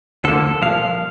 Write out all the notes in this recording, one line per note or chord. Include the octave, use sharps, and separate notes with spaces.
D2 D3 F3 A#3 A4
C2 A#2 F3 F5